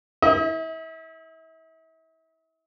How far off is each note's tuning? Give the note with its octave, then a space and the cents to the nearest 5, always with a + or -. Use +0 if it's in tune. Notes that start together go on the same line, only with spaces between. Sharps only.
E4 -35 D#5 +40